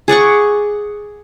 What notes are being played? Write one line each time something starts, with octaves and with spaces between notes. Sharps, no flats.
G#4 D5 F#5 C#6